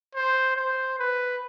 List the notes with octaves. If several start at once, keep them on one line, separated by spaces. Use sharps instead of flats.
C5
C5
B4